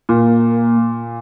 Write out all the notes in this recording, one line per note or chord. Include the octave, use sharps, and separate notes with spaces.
A#2 A#3